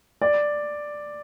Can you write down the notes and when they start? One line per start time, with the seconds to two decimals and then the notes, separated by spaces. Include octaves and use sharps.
0.22 D5